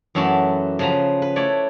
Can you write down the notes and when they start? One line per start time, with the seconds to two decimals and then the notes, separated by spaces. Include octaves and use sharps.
0.15 F#2 E3 A3 F#4 A5 B5
0.79 C#3 F3 B4 A#5
1.22 B4
1.36 A3 E4 C#5 D5